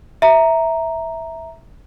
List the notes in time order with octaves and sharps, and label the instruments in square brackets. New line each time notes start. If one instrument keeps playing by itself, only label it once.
[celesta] E5 A#5